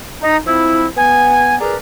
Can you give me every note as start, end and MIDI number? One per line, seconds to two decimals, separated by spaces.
0.22 0.37 63
0.46 0.87 53
0.46 0.87 60
0.46 0.87 64
0.97 1.56 59
0.97 1.56 80
1.60 1.76 68
1.60 1.76 70
1.60 1.76 71
1.60 1.76 74
1.60 1.76 82